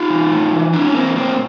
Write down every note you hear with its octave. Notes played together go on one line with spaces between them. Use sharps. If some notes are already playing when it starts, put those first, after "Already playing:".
Already playing: D#4 F4
E3
A2
E3
A2 D4 E4
C#4
E3 A#3 C4
A2 A#3 C4